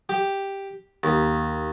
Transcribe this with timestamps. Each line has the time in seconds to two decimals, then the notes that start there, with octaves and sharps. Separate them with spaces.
0.09 G4
1.03 D#2